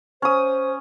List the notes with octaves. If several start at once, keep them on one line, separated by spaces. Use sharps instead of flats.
C#4 C5 D#6